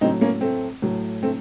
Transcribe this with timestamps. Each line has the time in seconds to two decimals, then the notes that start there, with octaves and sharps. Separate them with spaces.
0.01 A2 C4 D#4
0.05 F#3
0.21 A#3 C#4
0.41 A3 C4
0.82 A2 F#3
1.23 A3 C4